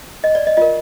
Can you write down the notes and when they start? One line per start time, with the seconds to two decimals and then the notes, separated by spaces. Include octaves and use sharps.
0.24 D#5
0.35 D5
0.47 D#5
0.57 F4 A#4 D#5